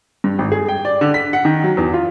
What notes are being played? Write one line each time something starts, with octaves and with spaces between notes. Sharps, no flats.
G2
G#1
G#4
G5
D5
D3
B6
F#5
D#3
F#3
E2
F4